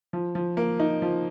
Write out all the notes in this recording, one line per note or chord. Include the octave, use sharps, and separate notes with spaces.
F3
F3
A#3
D#4
F3